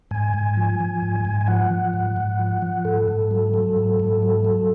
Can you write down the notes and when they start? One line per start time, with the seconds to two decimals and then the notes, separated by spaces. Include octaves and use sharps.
0.11 G#2 G#5
0.34 G#2
0.57 F3
0.80 F3
1.02 G#2
1.25 G#2
1.41 G#5
1.48 F3 F#5
1.70 F3
1.93 G#2
2.17 G#2
2.39 F3
2.62 F3
2.85 G#2 A4
3.08 G#2
3.31 F#3
3.54 F#3
3.76 G#2
4.00 G#2
4.22 F#3
4.45 F#3